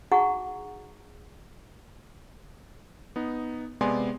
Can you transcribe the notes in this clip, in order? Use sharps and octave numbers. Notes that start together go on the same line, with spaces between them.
D#4 F#4 G#4 F#5 A#5 C#6
B3 D#4
C3 G#3 B3 D5 G#5 C6